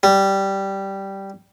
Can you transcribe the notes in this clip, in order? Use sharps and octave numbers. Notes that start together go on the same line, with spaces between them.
G3